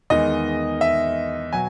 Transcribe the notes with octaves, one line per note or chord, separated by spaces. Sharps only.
E2 D#3 G#3 D#5
E5
B2 F#3 G#5